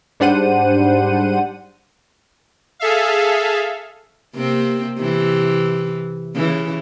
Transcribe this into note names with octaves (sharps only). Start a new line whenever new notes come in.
G#2 G3 D4 C5 F#5 D#7
G#4 A4 E5 F5
C3 A#3 C4
C3 E3
C#3 E3